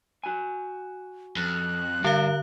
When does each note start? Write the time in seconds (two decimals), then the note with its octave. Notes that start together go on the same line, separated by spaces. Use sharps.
0.24 F#4 G#5
1.37 F2 F#6
2.04 G2 D3 A#4 F5